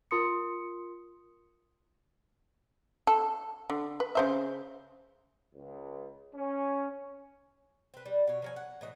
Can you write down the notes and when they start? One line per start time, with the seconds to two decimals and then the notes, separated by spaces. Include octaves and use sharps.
0.11 F4 A#4 C6 D#6 C#7
3.07 A4
3.70 D3
4.00 B4
4.15 C#3 C5 E5
5.55 C#2
6.34 C#4
7.94 C4 B4
8.06 G3
8.28 B2 C#5
8.42 F3 F#3 G#5
8.56 F#5
8.81 A2 E3 D#5